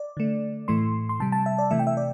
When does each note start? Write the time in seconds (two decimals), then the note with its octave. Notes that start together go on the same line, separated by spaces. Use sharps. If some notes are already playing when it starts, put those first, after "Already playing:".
Already playing: D5
0.17 D3 A3
0.68 A2 E3 A3 C6
1.09 C6
1.20 C3 G3 A5
1.32 A5
1.46 E5
1.58 D5
1.71 C3 E3 A3 E5
1.79 G5
1.87 E5
1.97 D5